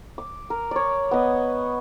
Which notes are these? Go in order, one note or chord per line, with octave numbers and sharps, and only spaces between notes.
D6
A#4
C#5 D5
B3 D#5